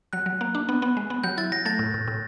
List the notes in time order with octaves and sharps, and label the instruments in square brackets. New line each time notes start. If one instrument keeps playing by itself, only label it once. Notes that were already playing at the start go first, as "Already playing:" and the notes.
[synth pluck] F#3 [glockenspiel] F#6
[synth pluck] F#3
A#3
D4
B3
B3
G#3
B3
[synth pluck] F#3 [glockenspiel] G6
[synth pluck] E4 [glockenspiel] A6
[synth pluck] F#3 [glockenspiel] A#6
[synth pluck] A3 [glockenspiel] A6
[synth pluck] A2
A2
A2